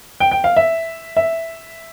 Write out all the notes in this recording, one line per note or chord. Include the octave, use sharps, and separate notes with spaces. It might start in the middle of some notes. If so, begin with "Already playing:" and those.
G5
G5
F5
E5
E5